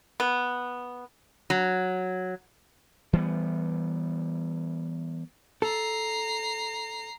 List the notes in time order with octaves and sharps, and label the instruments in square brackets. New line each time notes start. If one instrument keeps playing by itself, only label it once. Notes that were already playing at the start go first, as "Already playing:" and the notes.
[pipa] B3
[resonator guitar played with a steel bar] F#3
[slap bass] E3 G3 G#3 B3
[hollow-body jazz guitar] A4 [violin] A#5 C7